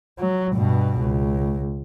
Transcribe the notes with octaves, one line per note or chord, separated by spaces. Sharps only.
F#3
G2 B2
C#2